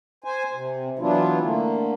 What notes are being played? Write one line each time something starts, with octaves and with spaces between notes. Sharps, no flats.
C5 G#5
C3
E3 F#3 B3 D4 E4 F4
D3 A3 A#3